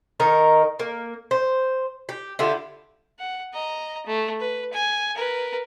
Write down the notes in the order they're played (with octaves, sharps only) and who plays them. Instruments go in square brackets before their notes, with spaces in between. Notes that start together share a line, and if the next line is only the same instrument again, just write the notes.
[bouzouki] D#3 D#4 A#4
A#3
C5
G4
D3 E4 F4 G4
[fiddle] F#5
D#5 A#5
A3
B4
G#5
A#4 B4